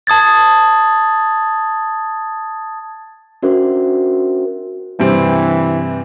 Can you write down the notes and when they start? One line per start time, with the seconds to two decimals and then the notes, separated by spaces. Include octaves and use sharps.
0.07 A5 D#6 G#6 A6
3.43 C#4 D4 F#4 A#4 C5 E5
5.00 G2 C3 E3 C4